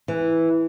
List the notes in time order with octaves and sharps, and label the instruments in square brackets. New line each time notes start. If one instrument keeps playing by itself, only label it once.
[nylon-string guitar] E3